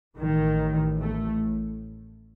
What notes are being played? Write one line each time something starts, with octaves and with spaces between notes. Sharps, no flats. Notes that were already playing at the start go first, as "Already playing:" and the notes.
A1 A2 D#3
A3